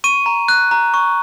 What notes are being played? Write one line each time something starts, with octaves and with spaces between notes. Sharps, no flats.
C#6 D#7
A#5
F#6
A#5
C#6